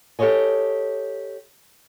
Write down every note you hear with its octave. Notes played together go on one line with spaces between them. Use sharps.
G4 A4 B4 C#5 D#5 G#5